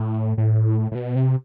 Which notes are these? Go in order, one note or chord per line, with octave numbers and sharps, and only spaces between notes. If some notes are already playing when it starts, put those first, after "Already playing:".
Already playing: A2
A2
A2
B2
C3